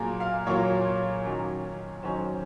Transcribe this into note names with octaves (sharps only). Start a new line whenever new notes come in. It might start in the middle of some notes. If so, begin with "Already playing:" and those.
Already playing: A#2 F#3 A#3 G#4 A#4
F5
A#2 F#3 A#3 C#5
D#3 F#3 C#4
D#3 F#3 C#4 C5